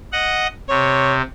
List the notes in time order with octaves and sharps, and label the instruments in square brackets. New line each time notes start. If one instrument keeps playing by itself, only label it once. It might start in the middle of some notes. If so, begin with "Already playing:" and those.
[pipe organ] D#5 F#5
[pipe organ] C3 [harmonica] C#5